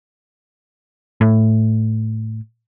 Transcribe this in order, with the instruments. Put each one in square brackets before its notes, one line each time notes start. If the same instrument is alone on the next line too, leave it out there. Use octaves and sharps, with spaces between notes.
[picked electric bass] A2